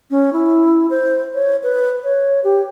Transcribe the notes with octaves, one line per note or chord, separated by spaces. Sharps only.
C#4
E4
C5
C#5
B4
C#5
G4